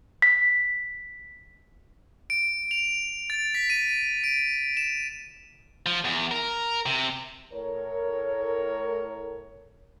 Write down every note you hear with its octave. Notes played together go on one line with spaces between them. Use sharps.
B6
D7
F7
A6
B6
D#7
D7
E7
F3
E2
A#4
C3
A2 A#4 C#5